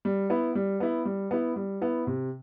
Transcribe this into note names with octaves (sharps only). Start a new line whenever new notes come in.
G3
B3 E4
G3
B3 E4
G3
B3 E4
G3
B3 E4
C3